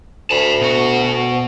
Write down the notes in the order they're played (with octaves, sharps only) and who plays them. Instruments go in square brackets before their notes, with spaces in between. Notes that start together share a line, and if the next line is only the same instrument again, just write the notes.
[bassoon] D2 [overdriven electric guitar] A5 B5
[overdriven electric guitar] B2 F#4